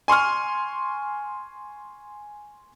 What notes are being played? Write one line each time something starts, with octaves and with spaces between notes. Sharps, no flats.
G#5 C6 C#6 F6